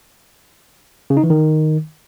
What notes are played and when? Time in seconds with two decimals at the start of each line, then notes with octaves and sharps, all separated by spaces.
1.10 C#3
1.17 D#4
1.23 E3
1.30 D#3